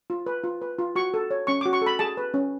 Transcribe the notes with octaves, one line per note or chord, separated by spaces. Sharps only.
F4
B4
F4
B4
F4
F#4 C#6
A4
C#5
C#4 C#6
D6
F#4
C#6
A4 B5
G#4 A5
B4
C#4